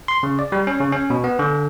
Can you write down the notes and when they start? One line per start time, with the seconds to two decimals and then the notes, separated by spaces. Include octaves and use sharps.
0.08 C6
0.23 C#3
0.39 D5
0.52 G3
0.67 C#4
0.80 C#3
0.92 C#4
1.10 B2
1.24 B3
1.39 D3